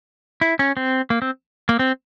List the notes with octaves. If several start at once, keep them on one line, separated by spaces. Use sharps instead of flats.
E4
C#4
C4
A#3
C4
A#3
C4